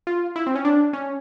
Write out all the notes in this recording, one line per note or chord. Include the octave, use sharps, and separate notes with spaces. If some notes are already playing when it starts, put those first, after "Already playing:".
F4
E4
C4
C#4
D4
C#4